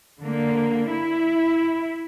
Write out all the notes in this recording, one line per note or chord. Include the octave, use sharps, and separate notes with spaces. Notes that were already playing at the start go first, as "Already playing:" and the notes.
D3 A#3
E4